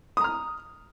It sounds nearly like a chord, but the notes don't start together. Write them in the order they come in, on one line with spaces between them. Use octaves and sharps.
D#6 A#5 F6